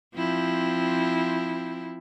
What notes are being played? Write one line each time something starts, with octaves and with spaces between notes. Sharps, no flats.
F3 C4 E4